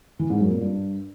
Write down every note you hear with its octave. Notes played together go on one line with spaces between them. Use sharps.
E3
G#2
F#2
A#2
G2